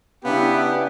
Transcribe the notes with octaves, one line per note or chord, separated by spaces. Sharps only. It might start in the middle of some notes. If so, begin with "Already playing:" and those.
C#3 B3 D4 E4 G4